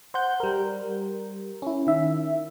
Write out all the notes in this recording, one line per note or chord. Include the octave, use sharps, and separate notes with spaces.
C5 F#5 G6
G3 A#4
C#4 E4
D#3 E5